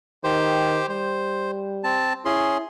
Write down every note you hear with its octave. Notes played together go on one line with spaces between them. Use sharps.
D#3 G4 C5
G3 C5
C4 A5
C#4 E4 G#4 C6